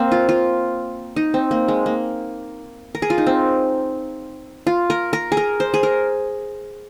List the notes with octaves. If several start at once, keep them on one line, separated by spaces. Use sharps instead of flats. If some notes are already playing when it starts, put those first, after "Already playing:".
Already playing: A#3 C4
F4
F4
D#4
C4
A#3
G#3
A#3
A#4
G#4
F4
D#4
C4
F4
A#4
A#4
G#4
A#4
C5
G#4
A#4